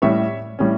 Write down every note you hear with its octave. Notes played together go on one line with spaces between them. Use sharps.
A2 G3 C#4 C#5 E5
A2 G3 C#4